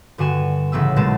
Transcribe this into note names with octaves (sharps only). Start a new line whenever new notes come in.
G2 D3 F#4 G#5 E7
A1 C#3 B3 E6
D#1 B1 B2 G#3 A5